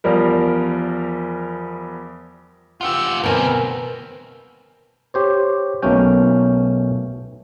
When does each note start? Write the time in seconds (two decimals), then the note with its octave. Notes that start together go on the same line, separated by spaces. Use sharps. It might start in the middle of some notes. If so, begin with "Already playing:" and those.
0.04 E2 F3 G3 A#4
2.81 F4 G4 F#5 E6
3.24 D2 B2 C4 A#4 B4 G5 G#5
5.14 G4 C5 C#5
5.82 B1 B2 A3 A#3 C#4 G5